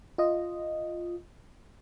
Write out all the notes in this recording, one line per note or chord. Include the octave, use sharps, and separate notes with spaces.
F4 D#5